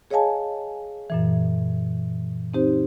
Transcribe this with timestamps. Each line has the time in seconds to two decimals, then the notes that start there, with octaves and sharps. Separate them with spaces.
0.10 G#4 C#5 D#5 F5 G#5 A5
1.10 F#2 A#2 E3
2.54 C4 D#4 G4 C5